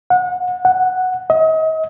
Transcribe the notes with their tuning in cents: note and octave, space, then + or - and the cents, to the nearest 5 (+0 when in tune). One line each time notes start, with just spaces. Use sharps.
F#5 -30
F#5 +0
D#5 +40